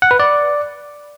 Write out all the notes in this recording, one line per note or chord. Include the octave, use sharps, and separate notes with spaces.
F#5
B4
D5